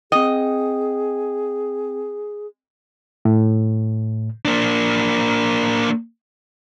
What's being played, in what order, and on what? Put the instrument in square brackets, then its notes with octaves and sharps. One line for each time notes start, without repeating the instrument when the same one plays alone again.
[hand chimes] C4 G5 [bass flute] G#4 [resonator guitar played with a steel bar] D#5
[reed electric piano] A2
[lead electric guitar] A#3 D4